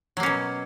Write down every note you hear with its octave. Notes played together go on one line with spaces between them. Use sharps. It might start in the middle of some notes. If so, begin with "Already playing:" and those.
B2 F#3 A#3 C#4